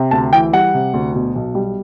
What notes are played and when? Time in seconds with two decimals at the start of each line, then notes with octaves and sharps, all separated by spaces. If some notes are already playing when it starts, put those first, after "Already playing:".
Already playing: C3
0.11 D2 A5
0.32 E3 G5
0.53 G3 F#5
0.74 C3
0.94 D2
1.15 B2
1.35 B1
1.55 G3